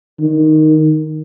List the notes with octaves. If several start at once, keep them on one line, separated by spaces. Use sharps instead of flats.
D#3